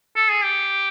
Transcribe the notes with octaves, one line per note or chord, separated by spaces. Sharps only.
A4
G#4
G4